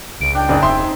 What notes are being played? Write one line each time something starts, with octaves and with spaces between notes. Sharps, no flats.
C#2 D7
D4 G5
F#1 D4 D#4 G#4
D#1 C4 D#4 E5 C6